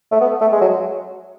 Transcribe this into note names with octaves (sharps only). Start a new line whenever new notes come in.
A3
B3
A3
G#3
F#3